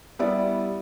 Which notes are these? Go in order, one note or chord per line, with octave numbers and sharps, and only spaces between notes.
G3 B3 E4 D5